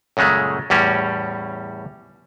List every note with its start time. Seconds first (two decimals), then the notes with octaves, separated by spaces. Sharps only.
0.17 F#2 A#2 C#3 G#3 A3
0.70 E2 A2 G3 C#4